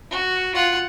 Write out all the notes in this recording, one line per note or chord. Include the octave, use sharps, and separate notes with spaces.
F#4
F4 F#5